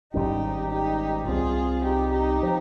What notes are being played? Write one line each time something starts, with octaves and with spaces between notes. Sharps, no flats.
G#1 G#2 G3 C#4 D#4 G4
D#4 G4
C2 C3 G3 C4 F4 G#4
D#4 G4
D#4 G4
F3